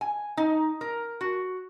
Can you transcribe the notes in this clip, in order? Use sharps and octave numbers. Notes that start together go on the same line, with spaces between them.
G#5
D#4
A#4
F#4